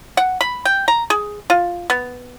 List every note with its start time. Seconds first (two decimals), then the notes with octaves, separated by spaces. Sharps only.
0.17 F#5
0.41 B5
0.65 G5
0.88 A#5
1.10 G#4
1.50 F4
1.90 B3